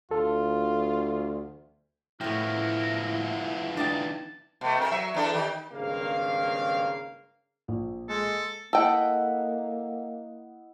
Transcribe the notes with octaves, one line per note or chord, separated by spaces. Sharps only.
D2 F4 A4
A2 F3 B3 E4 A#4 G5
D4 D#4 G5 A5
B2 A3
C3 A#4
F#3 E5
E2 D4 A4
D#3 G4
G#1 G2 C#3 A#3 F5
A#1
G#3 A4
A#3 E4 A4 D#5 F#5 G5